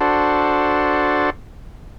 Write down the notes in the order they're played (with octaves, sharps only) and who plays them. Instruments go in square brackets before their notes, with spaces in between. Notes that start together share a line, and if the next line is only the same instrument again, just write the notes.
[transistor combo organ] D4 F#4 A4 C5